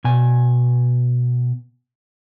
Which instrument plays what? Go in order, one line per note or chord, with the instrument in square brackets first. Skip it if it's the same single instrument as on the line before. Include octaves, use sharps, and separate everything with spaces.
[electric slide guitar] B2 G#5